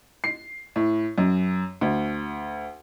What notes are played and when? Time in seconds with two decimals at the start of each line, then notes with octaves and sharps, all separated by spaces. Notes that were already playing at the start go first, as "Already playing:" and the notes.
0.24 C7
0.76 A2
1.18 F#2
1.81 D2